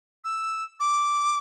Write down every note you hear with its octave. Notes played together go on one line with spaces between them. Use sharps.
E6
D6